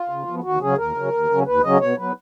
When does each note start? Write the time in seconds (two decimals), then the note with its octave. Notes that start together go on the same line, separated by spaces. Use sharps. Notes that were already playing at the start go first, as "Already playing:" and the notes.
Already playing: F4
0.09 C#3
0.27 F3 B3
0.43 D#2 F#4
0.61 C#3 F#3 C#4 G#4
0.78 D#2 A#4
0.95 C#3 F#3 C#4
1.13 D#2
1.30 C#3 F#3 C#4
1.46 D#2 B4
1.63 C#3 F#3 C#4 D#5
1.80 B2 C#5
1.98 F#3 B3 B4